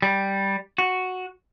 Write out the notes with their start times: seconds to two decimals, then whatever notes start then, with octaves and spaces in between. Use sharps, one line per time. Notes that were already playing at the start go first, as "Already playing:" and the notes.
0.02 G3
0.78 F#4